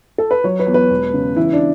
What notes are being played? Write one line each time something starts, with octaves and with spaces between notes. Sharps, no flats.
A4
B4
F#3 C#5
B4
E2
B4
E1
C#3
E3 E4
D4